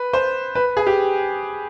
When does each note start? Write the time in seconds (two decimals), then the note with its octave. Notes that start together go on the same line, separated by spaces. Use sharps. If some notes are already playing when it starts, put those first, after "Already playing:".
Already playing: B4
0.13 C5
0.55 B4
0.77 G#4
0.86 G4